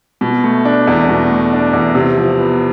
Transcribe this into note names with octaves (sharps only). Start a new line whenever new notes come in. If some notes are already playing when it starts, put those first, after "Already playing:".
B2
A3
D4
E2
B2
A3
D4
E2
C3
F3
B3